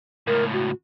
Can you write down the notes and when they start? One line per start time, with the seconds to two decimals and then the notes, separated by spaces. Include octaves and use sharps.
0.27 C#2 A2 A#4
0.53 F#4